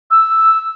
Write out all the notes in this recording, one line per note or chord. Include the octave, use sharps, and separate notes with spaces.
E6